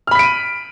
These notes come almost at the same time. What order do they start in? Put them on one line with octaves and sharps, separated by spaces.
F6 B5 B6 D7 D#7